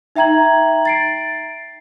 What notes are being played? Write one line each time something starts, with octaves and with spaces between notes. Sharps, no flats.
D#4 E5 G5 A#5 G#6 F#7
A6 C7 D7